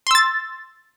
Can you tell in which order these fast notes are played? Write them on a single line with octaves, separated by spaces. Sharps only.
C6 E6 A6